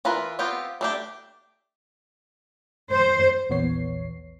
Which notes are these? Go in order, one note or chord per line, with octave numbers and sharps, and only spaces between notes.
E3 F4 A#4 B4
B3 C4 F4 G4
A3 D4 G4
C5
A#1 E2 B3 C#5 C7